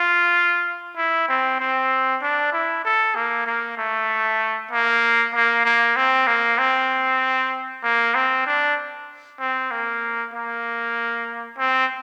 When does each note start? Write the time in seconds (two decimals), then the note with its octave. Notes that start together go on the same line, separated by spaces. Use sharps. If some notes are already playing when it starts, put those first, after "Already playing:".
Already playing: F4
0.97 E4
1.28 C4
1.60 C4
2.22 D4
2.53 E4
2.84 A4
3.15 A#3
3.46 A#3
3.78 A3
4.71 A#3
5.35 A#3
5.65 A#3
5.96 C4
6.27 A#3
6.58 C4
7.83 A#3
8.15 C4
8.46 D4
9.40 C4
9.71 A#3
10.34 A#3
11.58 C4